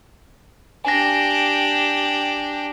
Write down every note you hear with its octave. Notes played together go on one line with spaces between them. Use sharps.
D4 G4 G#5 A#6